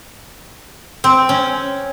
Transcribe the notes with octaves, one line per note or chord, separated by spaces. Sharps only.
C4
C#4